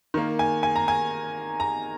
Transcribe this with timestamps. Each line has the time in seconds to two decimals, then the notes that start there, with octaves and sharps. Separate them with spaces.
0.14 D#3 A#3
0.39 G#5
0.63 G#5
0.76 A#5
0.88 G#5
1.60 A#5